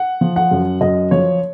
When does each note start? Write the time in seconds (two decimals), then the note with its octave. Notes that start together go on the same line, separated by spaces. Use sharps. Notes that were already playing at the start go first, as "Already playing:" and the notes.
Already playing: F#5
0.21 F3
0.36 F#5
0.51 F#2
0.81 F#2 D#5
1.11 F3 C#5